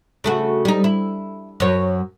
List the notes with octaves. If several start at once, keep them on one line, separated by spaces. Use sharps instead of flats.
C#3 A3 F#4
G3 D#4
E4
F#2 C#5